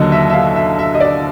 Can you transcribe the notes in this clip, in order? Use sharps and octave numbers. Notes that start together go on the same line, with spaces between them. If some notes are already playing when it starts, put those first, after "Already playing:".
Already playing: D#2 D3 F#3 D#5
E5
E5
F5
E5
E5
D#5
D5